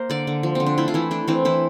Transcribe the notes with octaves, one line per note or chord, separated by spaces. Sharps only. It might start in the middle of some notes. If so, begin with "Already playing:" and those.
Already playing: A#3 A#4 C5
D3 D5
D3
F3
D3 C4
D4
A3 E4
F4
E3 E4
A3 D4
E3 C4
E3 E4